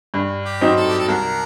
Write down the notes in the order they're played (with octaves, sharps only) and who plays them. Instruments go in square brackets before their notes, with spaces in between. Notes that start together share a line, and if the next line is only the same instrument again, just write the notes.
[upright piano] G2
[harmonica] G4
[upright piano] F#3 C4 D#4
[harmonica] A4
G4
A4
[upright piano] C2 [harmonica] A#4